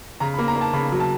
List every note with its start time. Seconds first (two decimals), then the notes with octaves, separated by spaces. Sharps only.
0.20 C#3 A#5
0.34 B5
0.39 A#3
0.48 A#5
0.56 A#3
0.61 A5
0.73 C#3 B5
0.92 F#3
1.00 A5